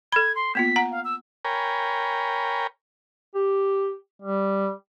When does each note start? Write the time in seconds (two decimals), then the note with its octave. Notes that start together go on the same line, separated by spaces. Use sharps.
0.12 A4 B5 G#6
0.36 C6
0.55 A#3 B3 F4 B6
0.76 F#5 A#5
0.91 F5
1.05 E6
1.45 A#4 C#5 G5 G#5 A#5 B5
3.35 G4
4.22 G3